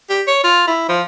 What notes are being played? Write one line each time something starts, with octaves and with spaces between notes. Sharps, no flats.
G4
C#5
F4
E4
F3